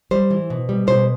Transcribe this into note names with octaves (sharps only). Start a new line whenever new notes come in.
G3 C5
E3
B2
G3
B2 C5